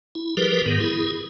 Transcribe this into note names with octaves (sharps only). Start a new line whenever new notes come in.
E4
F3 G3 G4 G#4 A#4 B4
G#2 D#3 B3
E4 G#4